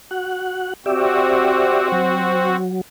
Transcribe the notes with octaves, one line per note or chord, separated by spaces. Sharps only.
F#4 F#5
C4 F#4 G4 D5 E5
F#3